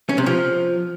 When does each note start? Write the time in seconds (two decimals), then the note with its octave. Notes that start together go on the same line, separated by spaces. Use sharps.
0.09 C#4
0.18 C3
0.26 F3